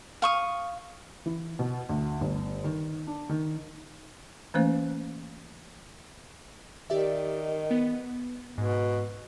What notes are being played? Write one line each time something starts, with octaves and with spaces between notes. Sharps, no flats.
F5 C#6 D#6
E3
B2
D2
G1
D#3
D4
D#3
E3 A3 A#3 C#4 C5 F5
D#3 G4 D5 E5
B3
G#2 B2